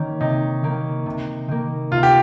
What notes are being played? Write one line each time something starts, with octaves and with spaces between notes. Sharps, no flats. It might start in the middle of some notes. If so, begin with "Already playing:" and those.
Already playing: D#3 A#3 C#4
C3 D#4
D#3 A#3
C3
D#3 A#3
C3 F4
G4